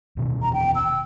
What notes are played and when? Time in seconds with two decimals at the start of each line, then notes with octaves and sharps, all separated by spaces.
0.17 E1 B2 D#3
0.42 A#5
0.53 G5
0.75 E6